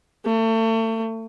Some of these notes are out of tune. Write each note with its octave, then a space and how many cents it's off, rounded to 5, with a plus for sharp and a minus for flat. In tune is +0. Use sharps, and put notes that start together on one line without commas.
A3 +35